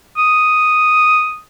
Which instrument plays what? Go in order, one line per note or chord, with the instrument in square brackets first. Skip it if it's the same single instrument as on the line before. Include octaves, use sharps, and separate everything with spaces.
[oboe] D#6